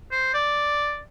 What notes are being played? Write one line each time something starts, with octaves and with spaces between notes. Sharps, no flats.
C5
D5